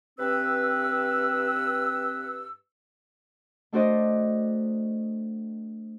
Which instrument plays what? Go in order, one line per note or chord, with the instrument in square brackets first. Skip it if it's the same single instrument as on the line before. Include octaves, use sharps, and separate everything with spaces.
[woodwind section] G2 C4 B4 E6
[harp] A3 D4 F#4 C5 D5 D#5